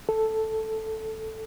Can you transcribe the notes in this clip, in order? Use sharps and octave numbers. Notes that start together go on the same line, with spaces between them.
A4